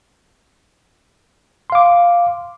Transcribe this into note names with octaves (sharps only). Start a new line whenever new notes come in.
F5 C6 D6